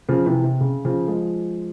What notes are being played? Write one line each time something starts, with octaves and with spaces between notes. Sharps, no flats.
C#3 F3
C3 E3
C3
C#3
C#3 F3
F3 G#3